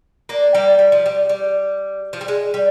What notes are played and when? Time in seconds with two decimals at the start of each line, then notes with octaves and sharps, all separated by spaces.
0.29 A#3 D4
0.55 G3 A#3
0.79 G3
0.92 F3
1.06 G3
1.29 G3
2.13 F3
2.21 G3
2.28 G#3
2.54 G3